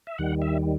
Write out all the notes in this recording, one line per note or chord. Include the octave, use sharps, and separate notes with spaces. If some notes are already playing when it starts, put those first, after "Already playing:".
E5
D#2 D#3 G3 F#5
E5